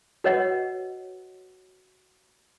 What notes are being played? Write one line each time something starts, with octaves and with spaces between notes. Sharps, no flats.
F#4 B4 C#5 D#5 F#5